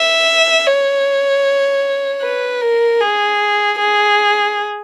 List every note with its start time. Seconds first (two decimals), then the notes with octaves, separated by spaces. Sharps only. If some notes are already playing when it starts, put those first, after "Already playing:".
Already playing: E5
0.66 C#5
2.22 B4
2.61 A#4
3.01 G#4
3.79 G#4